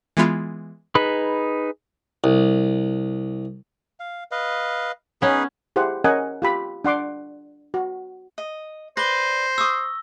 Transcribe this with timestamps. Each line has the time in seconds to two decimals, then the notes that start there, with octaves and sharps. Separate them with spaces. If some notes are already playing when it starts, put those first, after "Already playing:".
0.17 E3 G#3 B3 E4 F4
0.95 D#4 G#4 B4 B5
2.24 C2
4.00 F5
4.31 B4 D#5 F5
5.22 B3 C#4 D#4 G#4 B4
5.76 E4 G4 G#4 C5 F#5
6.04 C#4 A#4 D#5 F#5 G#5
6.42 F4 G4 B5
6.85 D4 F#5 C6 D6
7.74 F#4
8.38 D#5
8.97 B4 C5 D5 A#6 G7
9.58 C#6 D#6 E6